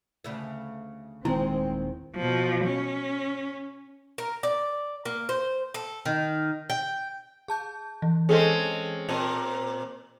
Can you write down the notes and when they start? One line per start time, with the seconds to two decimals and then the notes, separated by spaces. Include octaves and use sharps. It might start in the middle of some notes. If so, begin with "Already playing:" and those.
0.24 D2 C#3 E5
1.25 D#1 D#2 D#3 G#3 C4 E4
2.16 B2 F3
2.65 C#4
4.18 A#4
4.43 D5
5.05 A#3
5.29 C5
5.74 A4
6.06 D#3
6.70 G5
7.48 G#4 A5 G6
8.02 E3
8.29 G#3 C4 C#4 G#4 A4 C5
9.09 A#2 C4 A#4 F#7